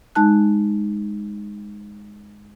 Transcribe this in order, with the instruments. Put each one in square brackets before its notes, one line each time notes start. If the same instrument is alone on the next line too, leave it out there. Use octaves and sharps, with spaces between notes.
[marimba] G#3 D#4 A5 F#6